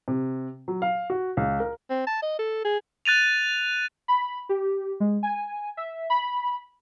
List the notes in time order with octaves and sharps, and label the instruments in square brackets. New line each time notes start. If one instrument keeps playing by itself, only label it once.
[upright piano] C3
F#3
F5
F#4
C#2
A#4
[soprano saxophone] C4
A5
D#5
A4
G#4
[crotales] F#6 A6 D#7 F7
[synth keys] B5
G4
G#3
G#5
E5
B5